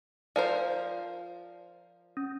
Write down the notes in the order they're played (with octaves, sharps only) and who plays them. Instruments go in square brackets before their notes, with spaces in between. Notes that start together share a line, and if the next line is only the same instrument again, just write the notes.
[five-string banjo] F3 A#4 C5 [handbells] D5
[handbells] C#4